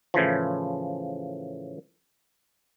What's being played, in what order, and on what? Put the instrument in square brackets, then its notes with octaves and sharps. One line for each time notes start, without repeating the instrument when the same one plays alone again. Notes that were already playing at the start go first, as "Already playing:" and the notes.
[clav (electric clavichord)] A2 C#3 E3 F3